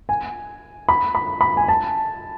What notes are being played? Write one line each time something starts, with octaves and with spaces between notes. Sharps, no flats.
G#5
B5
B5
B5
G#5
A5